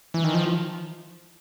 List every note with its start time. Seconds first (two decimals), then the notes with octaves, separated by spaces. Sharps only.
0.14 E3
0.24 D#3
0.34 F3